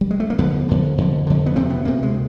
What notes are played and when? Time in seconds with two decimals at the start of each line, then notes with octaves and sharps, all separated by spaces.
0.01 G3
0.11 G#3
0.20 A3
0.30 A#3
0.38 F2 D3 B3
0.69 F2 D3
0.98 F2 D3
1.27 F2 D3
1.46 B3
1.55 D2 C3 C4
1.70 B3
1.85 D2 C3 A#3
2.03 G#3